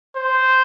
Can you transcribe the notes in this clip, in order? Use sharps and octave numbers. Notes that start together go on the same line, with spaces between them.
C5